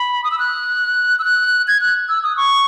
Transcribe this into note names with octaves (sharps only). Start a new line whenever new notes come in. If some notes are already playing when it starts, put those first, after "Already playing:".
Already playing: B5
D#6
E6
F#6
E6
F#6
G#6
F#6
E6
D#6
C#6